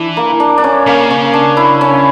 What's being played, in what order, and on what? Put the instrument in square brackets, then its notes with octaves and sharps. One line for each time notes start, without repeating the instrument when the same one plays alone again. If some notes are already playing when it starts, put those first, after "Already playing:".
Already playing: [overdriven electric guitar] E3 [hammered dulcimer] D4
[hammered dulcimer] A#3
D4
D4
C#4
[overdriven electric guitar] C#3 [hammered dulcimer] A#3
[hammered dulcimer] C#4
D4
E4
C#4